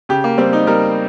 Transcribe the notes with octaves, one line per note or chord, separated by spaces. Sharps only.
C#3 G4
A#3
G3 C4
D#4
G3 A#4